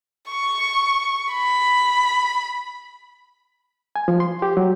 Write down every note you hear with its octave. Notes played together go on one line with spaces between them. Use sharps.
C#6
B5
G#5
F3
C6
G4
F#3